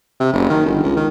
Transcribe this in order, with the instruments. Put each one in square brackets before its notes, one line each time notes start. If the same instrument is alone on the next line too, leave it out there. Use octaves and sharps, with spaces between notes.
[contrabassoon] C3
F#1
D#3
G1
C#2
D#3